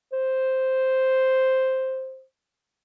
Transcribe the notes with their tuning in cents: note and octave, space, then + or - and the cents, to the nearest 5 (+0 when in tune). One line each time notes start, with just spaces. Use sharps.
C5 +0